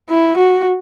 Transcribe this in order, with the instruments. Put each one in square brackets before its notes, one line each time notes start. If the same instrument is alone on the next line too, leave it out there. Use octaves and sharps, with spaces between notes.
[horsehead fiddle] E4
F#4